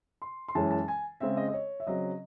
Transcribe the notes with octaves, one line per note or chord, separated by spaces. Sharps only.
C6
C6
F#2 E3 G#3 C#4 A5
A5
G#5
C#3 G#3 C4 E5
D#5
D#5
C#5
E5
C#3 F#3 C4 D#5